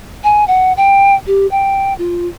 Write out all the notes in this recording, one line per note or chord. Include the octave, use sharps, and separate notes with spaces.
G#5
F#5
G5
G4
G5
F4